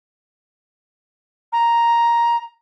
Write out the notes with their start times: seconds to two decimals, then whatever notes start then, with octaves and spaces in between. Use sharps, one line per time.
1.52 A#5